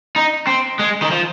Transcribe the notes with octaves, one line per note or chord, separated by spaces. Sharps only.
D#4
C4
G#3
D#3
F3